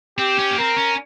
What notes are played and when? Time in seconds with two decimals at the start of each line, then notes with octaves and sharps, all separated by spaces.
0.18 C4 G4
0.39 C#4
0.51 A#3
0.58 C4 A#4
0.78 C#4